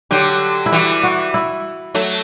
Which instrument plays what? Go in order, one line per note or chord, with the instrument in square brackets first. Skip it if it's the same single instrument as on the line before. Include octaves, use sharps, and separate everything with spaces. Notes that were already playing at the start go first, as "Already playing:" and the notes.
[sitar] D3 F#3 [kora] G4
[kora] E4
[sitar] E3 G3 [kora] F#4
[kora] F#4
E4
[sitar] F#3 A3